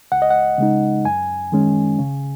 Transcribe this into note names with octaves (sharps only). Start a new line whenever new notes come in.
C#2 F#5
D#5
F#5
C#3 G#3 D#4
F#2 G#5
D#3 G#3 C#4
C#3